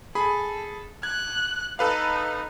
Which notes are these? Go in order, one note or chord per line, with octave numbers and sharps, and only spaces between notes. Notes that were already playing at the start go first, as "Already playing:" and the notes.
G#4 A4 B5
F#6 G#6
D#4 A4 B4 F5